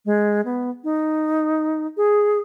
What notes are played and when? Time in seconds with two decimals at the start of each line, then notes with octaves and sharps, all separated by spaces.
0.06 G#3
0.45 B3
0.84 D#4
1.97 G#4